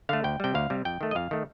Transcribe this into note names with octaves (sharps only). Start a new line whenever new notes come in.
D3 A3 F5
D2 G5
C3 G3 G5
D2 F5
C3 G3
F2 G5
D#3 A3
D#5
F2 F5
D#3 A3